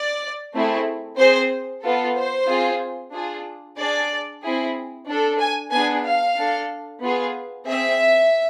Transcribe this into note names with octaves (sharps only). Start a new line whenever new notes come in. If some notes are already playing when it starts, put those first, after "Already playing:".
Already playing: D5
A3 C4 E4 G#4
C4 G#4 C5
B3 F4 A4
C5
C4 F4 G#4
D4 F4 G#4
D4 G#4 D5
C4 E4 G#4
D4 A4
G#5
B3 D4 G#4 G#5
F5
D4 A4
B3 F4 G#4
C4 G#4 E5